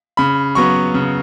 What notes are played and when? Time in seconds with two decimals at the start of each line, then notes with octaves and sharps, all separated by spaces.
0.17 C#3 B5
0.55 F#3 B3 C#6
0.94 C#3